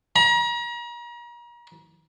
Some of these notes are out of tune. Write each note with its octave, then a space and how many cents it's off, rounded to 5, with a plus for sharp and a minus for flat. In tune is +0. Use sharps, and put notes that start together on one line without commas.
A#5 +40